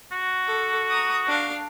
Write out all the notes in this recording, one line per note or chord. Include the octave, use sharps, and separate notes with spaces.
F#4
A4
A#5 D#6
D4 F5